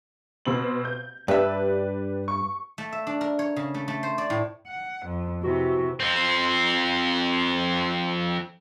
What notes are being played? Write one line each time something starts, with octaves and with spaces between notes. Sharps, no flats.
B2 C4 F#7
G6
G2 D4 G4 B4 E5
C#6
A3
E5
D4
A#4
C#5
C#3
A3
A3
C5
D5
A2
F#5
F2
C3 E3 F#4
F2 C4